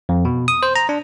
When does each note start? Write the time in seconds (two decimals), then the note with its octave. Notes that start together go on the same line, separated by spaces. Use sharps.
0.09 F2
0.25 B2
0.48 D#6
0.63 C5
0.76 A#5
0.89 D4